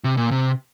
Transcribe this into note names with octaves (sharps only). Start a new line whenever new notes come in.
C3
A#2
C3